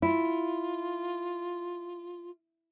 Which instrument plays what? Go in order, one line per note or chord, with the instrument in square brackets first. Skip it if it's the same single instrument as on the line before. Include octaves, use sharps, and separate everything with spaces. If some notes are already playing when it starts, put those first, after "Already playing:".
[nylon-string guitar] E4 [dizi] F4